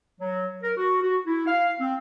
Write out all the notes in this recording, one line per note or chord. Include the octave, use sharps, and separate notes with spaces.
F#3
A#4
F#4
F#4
E4
F5
C4